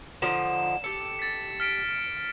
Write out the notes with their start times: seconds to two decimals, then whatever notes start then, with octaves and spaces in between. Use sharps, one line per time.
0.22 D3 F3 D#4 E7
0.84 G4 A4 C#7
1.19 A6 B6
1.60 F6 B6 D7